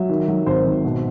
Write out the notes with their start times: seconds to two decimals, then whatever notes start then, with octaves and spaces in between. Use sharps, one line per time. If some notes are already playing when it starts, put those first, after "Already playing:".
Already playing: F#3 E5
0.09 D#3
0.28 F#3
0.46 G#1 C5
0.65 G#1
0.84 B2